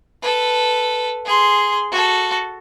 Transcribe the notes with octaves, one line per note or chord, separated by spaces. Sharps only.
A4 B4
G#4 C6
F#4 A4